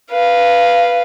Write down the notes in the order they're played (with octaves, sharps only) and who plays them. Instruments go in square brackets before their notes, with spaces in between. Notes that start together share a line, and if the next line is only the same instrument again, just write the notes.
[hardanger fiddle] B4 F5